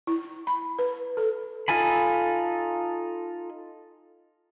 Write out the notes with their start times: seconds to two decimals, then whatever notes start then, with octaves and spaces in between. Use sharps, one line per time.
0.07 E4
0.47 B5
0.79 B4
1.17 A4
1.68 D#4 F4 A4 G#5 B5